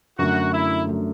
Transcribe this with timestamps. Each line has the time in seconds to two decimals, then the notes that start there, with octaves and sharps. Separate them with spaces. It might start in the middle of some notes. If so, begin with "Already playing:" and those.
0.18 F#2 D3 F#3 A3 F#4
0.53 E4
0.87 D3 F#3 A3